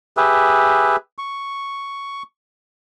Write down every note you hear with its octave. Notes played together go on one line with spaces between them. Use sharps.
G4 G#4 B4 E5
C#6